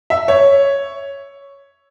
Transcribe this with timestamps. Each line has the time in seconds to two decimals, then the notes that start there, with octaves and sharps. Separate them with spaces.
0.10 E5
0.28 C#5